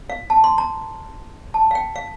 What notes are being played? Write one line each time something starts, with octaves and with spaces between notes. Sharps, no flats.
F5
A5
C6
A#5
A5
F5
G5
F5